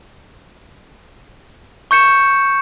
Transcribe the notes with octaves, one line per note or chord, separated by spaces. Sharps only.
C#6 G6 C#7 E7